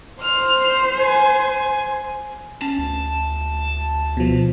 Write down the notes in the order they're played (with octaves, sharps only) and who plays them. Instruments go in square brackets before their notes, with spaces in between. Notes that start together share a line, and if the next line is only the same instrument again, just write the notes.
[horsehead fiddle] C5 [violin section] F6
[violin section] G#5
[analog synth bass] C#4 [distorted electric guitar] A5
[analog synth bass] D2
[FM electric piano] B2 F3